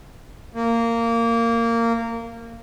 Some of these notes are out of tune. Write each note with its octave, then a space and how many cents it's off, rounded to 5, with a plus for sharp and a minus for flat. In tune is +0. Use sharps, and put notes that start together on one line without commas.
A#3 -15